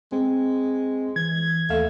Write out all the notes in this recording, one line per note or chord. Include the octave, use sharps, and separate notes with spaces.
G#3 C4
E3 G#6
D#2 A3 F5